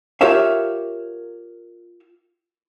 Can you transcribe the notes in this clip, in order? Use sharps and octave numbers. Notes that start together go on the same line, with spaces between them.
F4 G4 A#4 C#5 E5 F5